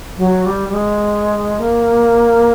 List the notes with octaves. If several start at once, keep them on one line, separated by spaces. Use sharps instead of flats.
F#3
G3
G3
G#3
A#3